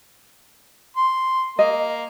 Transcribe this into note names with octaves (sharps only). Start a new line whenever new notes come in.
C6
A#3 D#5